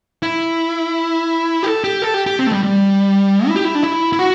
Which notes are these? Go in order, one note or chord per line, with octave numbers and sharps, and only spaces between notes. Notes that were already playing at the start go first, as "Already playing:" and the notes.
E4
G4
A4
G4
A4
G4
G4
C4
A3
G3
G3
E4
G4
E4
D4
E4
E4
F#4